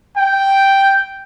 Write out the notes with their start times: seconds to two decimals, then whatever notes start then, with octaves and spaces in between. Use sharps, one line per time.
0.17 G5